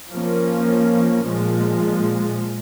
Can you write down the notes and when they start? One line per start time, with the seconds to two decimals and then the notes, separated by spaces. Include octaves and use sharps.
0.12 F3 A#3 C#4
1.25 A#2 F3 G#3